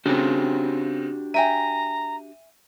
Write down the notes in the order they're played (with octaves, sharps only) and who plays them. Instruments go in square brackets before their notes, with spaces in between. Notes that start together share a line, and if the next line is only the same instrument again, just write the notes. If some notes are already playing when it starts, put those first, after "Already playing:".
[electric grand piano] C#3 C4 [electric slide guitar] D4 F#4 G4
[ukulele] E5 G5 G#5 [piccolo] A#5 [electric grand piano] D#7